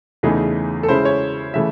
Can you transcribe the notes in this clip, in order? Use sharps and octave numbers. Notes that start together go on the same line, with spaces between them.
E2 C#3 E3 A3 D#4 G#4
A4
C#3 G#3 C#4 E4 C5
C#5
C#3 E3 A3 E5